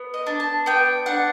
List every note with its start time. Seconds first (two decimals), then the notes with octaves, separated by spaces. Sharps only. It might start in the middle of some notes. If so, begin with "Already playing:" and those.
Already playing: B3
0.14 D#5
0.26 D4
0.40 A5
0.66 B3 G5
1.06 D4 F#5